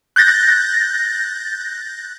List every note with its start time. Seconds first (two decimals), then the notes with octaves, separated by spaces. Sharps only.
0.16 F#6 G6 A6 A#6